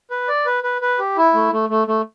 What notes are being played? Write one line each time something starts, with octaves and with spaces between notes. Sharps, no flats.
B4
D5
B4
B4
B4
G4
E4
A3
A3
A3
A3